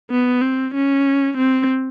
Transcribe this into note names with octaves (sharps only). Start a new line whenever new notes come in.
B3
C4
C#4
C4